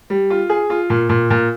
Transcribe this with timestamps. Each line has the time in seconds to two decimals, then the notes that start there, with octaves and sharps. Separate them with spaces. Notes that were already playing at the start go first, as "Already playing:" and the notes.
0.10 G3
0.30 F4
0.50 G#4
0.70 F4
0.90 A#2
1.09 A#2
1.30 A#2